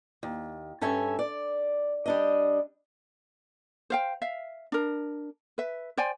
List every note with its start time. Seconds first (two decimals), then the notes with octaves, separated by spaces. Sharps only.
0.23 D#2
0.81 G2 C#4 A4 C#5 E5 G#5
1.19 D5
2.06 G3 D4 D#5
3.90 C5 F5 G5
4.22 E5 F5
4.72 D4 A#4
5.58 B4 E5
5.97 C5 D5 G5 G#5